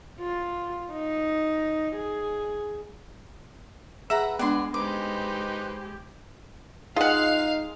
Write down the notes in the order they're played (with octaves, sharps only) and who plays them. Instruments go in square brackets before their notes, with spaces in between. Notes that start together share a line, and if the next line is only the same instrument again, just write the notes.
[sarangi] F4
D#4
G#4
[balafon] G#4 [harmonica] B4 [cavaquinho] E5 F#5 A#5
[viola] G#3 [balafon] B3 D4 [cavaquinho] D5 F#5 C6
[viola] G#3 G4 [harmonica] D#4 B4 C5 [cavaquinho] D6
[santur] G#3 [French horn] D#4 [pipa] F4 F#5 [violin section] F5